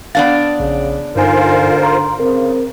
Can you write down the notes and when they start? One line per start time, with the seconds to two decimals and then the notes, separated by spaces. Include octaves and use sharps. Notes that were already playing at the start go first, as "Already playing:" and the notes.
0.15 B3 D4 F5 A6
0.60 A#1 C#3
1.16 G2 D3 D#4 F4 A#4 C5 G#5
1.83 A#5 C6
2.20 C#3 C4 A#4